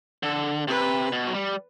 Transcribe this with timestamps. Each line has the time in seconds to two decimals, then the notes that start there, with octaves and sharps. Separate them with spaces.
0.23 D3 A4
0.68 C3 B4
1.12 B2
1.27 F#3
1.34 G3